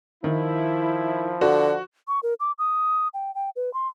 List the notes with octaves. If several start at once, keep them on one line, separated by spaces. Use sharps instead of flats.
D#3 F3 E4
D3 F#4
C#6
A#4
D6
D#6
G5
G5
B4
C6